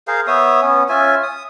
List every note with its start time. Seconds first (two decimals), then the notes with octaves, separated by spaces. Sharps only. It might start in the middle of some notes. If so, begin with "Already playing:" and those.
0.08 G#4 A#4 C5 F5
0.27 B3 C#5 E5 D#6
0.62 B3 C#4
0.89 C#4 F4 E5 G#5
1.23 D#6